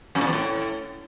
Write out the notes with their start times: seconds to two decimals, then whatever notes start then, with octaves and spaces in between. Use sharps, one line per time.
0.15 F#2
0.21 A#2
0.27 E2
0.33 A2